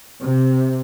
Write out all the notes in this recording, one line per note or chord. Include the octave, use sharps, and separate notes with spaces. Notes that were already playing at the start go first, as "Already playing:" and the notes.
C3